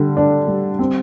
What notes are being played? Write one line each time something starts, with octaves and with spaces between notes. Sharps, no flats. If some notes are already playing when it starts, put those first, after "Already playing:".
Already playing: D3 G3
D4
G3
C4